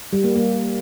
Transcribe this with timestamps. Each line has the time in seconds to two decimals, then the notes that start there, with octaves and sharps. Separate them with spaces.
0.13 G3
0.24 A#3
0.35 A#3